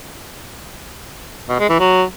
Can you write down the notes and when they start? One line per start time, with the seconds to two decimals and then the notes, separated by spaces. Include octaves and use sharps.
1.49 B2
1.59 G#3
1.69 E3
1.79 F#3